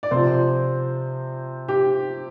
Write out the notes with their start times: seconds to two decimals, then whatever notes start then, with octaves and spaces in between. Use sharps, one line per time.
0.03 D5
0.11 C3 F3 C5
1.68 G4